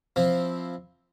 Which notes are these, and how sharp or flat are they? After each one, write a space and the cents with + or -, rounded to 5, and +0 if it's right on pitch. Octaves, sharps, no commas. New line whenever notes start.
F3 +0 C4 +0 E4 +0